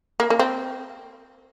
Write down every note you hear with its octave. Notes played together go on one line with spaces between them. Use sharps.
A#3
A#3
C4